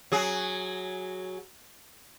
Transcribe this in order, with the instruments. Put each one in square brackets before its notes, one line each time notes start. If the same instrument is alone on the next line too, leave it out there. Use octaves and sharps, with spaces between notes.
[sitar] F#3 G#4